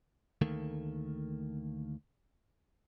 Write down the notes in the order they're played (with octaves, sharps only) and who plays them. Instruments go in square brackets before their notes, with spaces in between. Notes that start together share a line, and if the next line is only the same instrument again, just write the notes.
[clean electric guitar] D2 D#3 A3 A#3